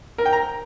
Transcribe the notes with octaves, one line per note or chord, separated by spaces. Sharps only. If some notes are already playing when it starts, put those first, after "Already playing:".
A#4
G5
A#5